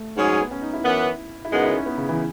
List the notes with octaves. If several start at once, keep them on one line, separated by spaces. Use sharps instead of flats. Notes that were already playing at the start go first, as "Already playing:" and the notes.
Already playing: A3
G#2 F#3 C#4 G#4
B3
C#4
D#4
E4
F#2 E3 B3
E4
F#2 C#3 G#3 B3 D#4
E4
C#4
B3
C#3
E3